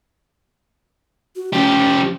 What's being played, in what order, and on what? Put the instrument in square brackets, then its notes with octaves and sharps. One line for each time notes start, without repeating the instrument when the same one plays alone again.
[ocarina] F#4
[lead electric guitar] F3 G4 [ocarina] C#4